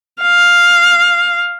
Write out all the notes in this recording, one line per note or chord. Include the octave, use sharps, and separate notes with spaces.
F5